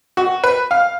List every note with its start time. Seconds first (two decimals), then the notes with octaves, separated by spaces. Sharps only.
0.17 F#4
0.44 B4
0.71 F5